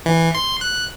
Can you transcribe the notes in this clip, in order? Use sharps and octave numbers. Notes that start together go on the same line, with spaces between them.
E3
C6
F#6